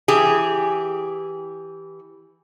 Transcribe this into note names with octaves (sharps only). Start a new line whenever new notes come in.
E3 G4 G#4